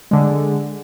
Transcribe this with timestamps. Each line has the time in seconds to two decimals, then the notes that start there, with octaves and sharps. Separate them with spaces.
0.11 D3 G#3